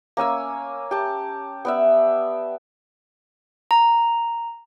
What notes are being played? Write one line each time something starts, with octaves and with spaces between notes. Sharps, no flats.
A#3 C#4 G#5 E6
G4 A5
B3 D5 E5
A#5